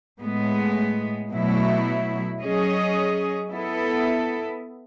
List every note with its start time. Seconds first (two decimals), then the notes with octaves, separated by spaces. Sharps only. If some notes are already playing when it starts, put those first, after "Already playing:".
0.21 A2 G#3 B3
1.30 B2 F#3 A3 E4
2.40 F#3 C#4 G#4 D#5
3.50 B3 E4 A4